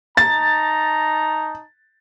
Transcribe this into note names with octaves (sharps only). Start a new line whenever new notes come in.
D#4 A5 A#5 A6